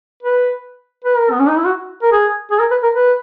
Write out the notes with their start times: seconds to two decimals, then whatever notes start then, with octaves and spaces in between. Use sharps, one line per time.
0.23 B4
1.04 B4
1.18 A#4
1.31 B3
1.40 C#4
1.48 D#4
1.57 E4
1.65 F#4
2.03 A#4
2.12 G#4
2.51 G#4
2.59 A#4
2.71 B4
2.83 A#4
2.95 B4